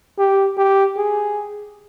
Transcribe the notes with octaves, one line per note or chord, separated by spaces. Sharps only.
G4
G4
G#4